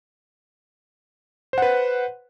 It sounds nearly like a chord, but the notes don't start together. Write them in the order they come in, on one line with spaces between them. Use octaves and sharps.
C5 F#5 B4